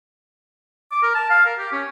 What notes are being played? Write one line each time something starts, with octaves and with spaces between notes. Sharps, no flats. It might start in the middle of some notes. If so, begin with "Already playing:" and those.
D6
A#4
A5
F5
A#4
G4
C#4